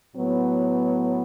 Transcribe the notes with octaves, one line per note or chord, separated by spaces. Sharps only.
A2 F#3 B3